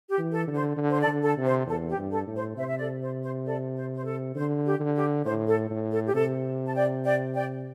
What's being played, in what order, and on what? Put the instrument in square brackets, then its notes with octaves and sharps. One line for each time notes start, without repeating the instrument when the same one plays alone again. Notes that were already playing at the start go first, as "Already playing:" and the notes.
[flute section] G4
[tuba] E3
[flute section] A4
[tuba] D3
[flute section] C5
[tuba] D3
[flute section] C5
A4 D5
[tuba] D3
[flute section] A4
[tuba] C3
[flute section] C5
[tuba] E2 [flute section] A4
[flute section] G4
[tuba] G2
[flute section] A4
[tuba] A2
[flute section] C5
[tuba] C3 [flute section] C5 E5
[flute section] E5
A4 D5
C5
C5
A4 D5
C5
C5
A4
[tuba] D3 [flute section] C5
[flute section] G4
[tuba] D3
[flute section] G4
[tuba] A2 [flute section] C5
[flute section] A4
[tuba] A2
[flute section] A4
G4
[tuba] C3 [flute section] A4
[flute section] A5
D5 G5
D5 G5
D5 G5